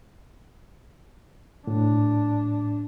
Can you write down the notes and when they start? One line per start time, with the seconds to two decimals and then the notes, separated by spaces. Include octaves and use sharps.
1.67 A2 D4